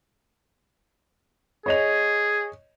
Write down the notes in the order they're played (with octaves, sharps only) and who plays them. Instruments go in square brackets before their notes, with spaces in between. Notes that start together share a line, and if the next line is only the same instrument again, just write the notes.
[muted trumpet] G#4 [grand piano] C#5 D#5 F7